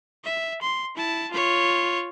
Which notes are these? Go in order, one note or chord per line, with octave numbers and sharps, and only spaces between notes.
E5
C6
E4 A5
F4 C#5